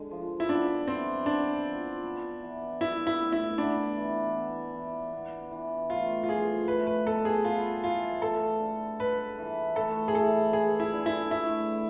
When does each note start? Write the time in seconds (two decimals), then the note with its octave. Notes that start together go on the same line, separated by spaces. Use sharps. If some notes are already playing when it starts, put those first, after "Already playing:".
Already playing: D3 G#3
0.11 F3
0.40 E4
0.49 B3 D4
0.88 E3 C4
1.26 B3 D4
1.65 F3
2.03 B3
2.42 E3
2.81 G#3 E4
3.07 E4
3.20 A2
3.32 E4
3.58 B3 D4
3.97 E3
4.36 B3
4.74 E3
5.13 B3
5.51 E3
5.90 A3 F4
6.24 F4
6.29 F3 G#4
6.68 A3 B4
6.87 B4
7.05 B2 A4
7.25 G#4
7.45 B3 F4
7.84 E3 F4
8.21 A3 A4
8.60 D3
9.00 G#3 B4
9.38 E3
9.76 A3 A4
10.08 G#4
10.15 E3 A4
10.53 G#3 G#4
10.80 E4
10.93 D3
11.06 E4
11.31 A3 E4
11.70 E3